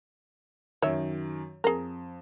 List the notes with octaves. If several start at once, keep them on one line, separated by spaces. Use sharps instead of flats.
F#2 D#3 C#5 E5
F2 G#4 A#4